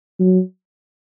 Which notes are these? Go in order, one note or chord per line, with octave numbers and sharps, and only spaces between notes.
F#3